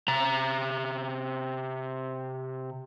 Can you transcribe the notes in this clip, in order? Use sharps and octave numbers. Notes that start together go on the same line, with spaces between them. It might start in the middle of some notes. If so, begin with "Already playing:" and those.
C3 A#5